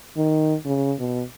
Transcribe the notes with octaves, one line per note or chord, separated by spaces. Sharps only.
D#3
C#3
B2